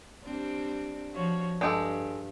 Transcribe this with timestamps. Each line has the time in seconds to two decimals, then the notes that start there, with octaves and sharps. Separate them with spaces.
0.24 G3 C4 D4
1.14 F3 F#4 C#5
1.61 G2 G#3 G4 A4